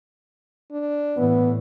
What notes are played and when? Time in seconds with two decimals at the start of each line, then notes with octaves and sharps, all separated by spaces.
0.72 D4
1.17 A2 E3 B3